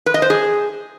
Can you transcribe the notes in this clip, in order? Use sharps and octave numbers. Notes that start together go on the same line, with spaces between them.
B4
D#5
C5
G#4